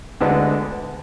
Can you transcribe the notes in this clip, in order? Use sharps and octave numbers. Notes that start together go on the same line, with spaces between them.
D2 D3 G#3 B3 D4